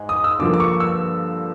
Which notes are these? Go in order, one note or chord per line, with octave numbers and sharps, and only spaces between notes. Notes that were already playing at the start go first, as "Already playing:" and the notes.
Already playing: G#2 G#3
D#6
E6
G2 D3 F3 A#3 D6
D6
C#6
E6